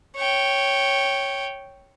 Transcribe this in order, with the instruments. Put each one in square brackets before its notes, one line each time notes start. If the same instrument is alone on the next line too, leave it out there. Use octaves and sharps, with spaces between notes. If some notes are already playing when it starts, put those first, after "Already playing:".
[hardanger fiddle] C#5 G5